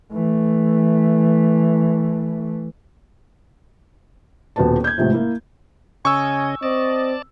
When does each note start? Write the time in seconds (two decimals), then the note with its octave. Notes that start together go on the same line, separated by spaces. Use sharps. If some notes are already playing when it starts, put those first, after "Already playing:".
0.13 E3 A3
4.56 D#1 B2 B3 B4 A5
4.84 G6 G#6
4.98 A1 G#2 C3 F3
5.12 A#3 E4
6.05 C#3 C#4 D#5 G#5 C#6 E6
6.63 C4 D5 D#5 A5